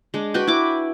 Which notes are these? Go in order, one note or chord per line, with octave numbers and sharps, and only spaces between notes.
G#3 D4
F#4 B4 G5
E4 B4 D6